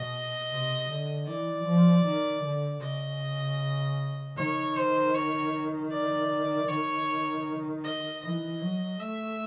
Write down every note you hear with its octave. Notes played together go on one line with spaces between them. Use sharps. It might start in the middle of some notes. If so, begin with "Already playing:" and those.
Already playing: B2 D#5
C3
D3
E3 D5
F3
D#3
D3
C#3 D#5
D#3 C#5
C5
C#5
D5
D#3 C#5
D#5
E3 D#5
F#3
A3 E5